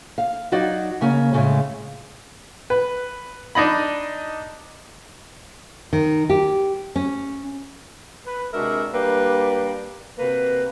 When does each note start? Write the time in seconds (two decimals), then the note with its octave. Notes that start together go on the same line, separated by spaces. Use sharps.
0.18 F5
0.52 F#3 D#4 F#4 D5
1.01 C#3 A#3 C#4
1.33 A2 C#3 G#3
2.70 B4
3.55 D4 D#4 D#5 B5
5.93 D#3
6.30 G4
6.96 C#4
8.25 B4
8.53 C3 G#3 D4 F#4 A#4 E5
8.93 G3 A#3 D4 G4 B4
10.18 C3 A#3 F#4 B4